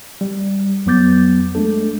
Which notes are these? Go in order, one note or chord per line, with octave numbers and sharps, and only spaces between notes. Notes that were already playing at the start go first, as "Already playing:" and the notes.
G3
F2 F#3 B3 D6 G6 A6
G#3 A3 D4 A4